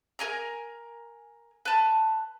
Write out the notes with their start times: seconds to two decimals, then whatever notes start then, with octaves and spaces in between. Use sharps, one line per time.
0.19 A#4 D#5 G#5 A#5
1.65 B4 A5